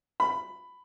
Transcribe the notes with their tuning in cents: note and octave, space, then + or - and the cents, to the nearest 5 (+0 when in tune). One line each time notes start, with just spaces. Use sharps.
B5 +10